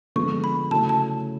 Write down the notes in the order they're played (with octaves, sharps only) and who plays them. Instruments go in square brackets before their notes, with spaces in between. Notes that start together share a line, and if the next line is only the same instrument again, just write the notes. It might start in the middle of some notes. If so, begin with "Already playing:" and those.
[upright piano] D3 F3 G#3 B3 [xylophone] C#6
[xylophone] B5
[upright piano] C#3 F#3 A3 C#4 E4 [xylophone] A5
[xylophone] A5